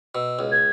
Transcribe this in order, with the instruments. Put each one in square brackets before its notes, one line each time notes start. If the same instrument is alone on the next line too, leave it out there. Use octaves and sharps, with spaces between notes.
[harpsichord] B2 [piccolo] E6
[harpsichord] C#2
[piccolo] G#6